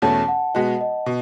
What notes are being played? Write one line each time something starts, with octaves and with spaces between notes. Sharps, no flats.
E2 B2 A3 C#4 A5
F#5
B2 G#3 B3 F#4 D#5
D#5
B2